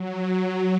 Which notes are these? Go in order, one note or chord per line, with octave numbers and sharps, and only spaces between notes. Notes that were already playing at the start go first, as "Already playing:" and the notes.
Already playing: F#3